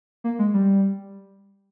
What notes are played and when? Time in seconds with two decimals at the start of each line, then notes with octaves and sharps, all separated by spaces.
0.24 A#3
0.39 G#3
0.54 G3